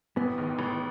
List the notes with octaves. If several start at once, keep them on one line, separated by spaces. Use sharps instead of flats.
A1 B3
G#2 D#3
A1